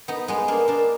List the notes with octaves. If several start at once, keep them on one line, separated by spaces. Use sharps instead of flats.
B3 D#4
G#3 B3
A#3 D4
A#3 D4